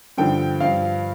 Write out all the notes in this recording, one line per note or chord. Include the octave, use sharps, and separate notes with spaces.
G2 D3 F3 G5
G2 F3 F5